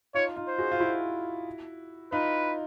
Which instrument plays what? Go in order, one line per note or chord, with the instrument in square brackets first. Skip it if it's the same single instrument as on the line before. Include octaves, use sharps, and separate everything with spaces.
[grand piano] D#4 F4 [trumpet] C#5
[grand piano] D#4 F4
[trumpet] C5
[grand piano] F#4 G#4
F4
E4 F#4
[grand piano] D#4 F4 [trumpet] B4